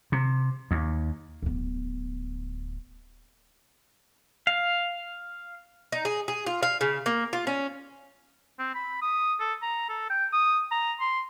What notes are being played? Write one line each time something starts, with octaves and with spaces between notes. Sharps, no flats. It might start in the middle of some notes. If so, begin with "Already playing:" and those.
C3
D#2
D1 B3
F5
D#4
G#4
G#4
F4
F5
C#3
A#3
F4
C#4
C4
B5
D#6
A4
A#5
A4
G5
D#6
A#5
C6